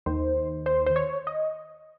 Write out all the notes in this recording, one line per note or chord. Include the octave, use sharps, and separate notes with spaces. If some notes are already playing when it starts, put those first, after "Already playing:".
D#2 D#3 C5
C5
C5
C#5
D#5